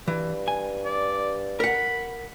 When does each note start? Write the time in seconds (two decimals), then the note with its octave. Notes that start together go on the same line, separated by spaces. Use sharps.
0.08 G2 E3
0.48 G#5
0.85 D5
1.60 A#4 F#5 B5